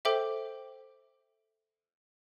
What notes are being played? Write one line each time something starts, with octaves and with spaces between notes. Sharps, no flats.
A4 C5 E5 G5 D6